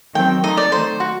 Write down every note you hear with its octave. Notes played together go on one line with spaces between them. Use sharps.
D#3 F#3 C4 G5
D#3 A3 D#4 D#5
D5
D#3 F#3 A3 D#4 C5
F#4